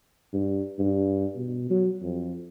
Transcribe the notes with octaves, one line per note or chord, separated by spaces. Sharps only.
G2
G2
B2
F#3
F2